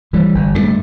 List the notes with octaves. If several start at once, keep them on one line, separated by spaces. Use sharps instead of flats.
G2 E3 G3
G1
G2 F#3 A3